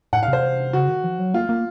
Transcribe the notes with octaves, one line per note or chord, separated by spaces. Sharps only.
A2 F#5
F5
C3 C5
C#3 F#4
D#3
F3
F#3
A#3 F4
A#3